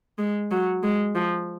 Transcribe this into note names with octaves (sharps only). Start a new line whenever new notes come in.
G#3
F#3
G#3
F3